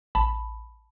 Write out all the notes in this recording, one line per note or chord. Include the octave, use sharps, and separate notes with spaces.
A1 A5 B5